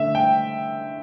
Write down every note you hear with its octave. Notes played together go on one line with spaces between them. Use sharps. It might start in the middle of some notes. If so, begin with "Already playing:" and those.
Already playing: D3 A3 E5
G5